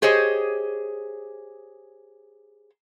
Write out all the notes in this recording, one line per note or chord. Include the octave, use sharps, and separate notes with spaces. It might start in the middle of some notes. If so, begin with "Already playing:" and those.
G4 G#4 C5 C#5 D#5